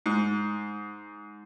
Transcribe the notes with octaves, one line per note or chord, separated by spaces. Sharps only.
G#2